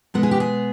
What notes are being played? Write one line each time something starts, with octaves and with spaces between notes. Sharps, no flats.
B2 G#3 B3 A4
G#4
G4
G#4